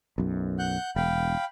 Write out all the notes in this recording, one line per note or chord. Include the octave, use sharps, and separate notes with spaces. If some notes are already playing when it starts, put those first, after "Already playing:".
B1 F#2
F#5 F#6 G6
E1 F5 G5 B5